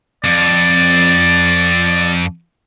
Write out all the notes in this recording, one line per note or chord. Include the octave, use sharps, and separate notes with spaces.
F2 D5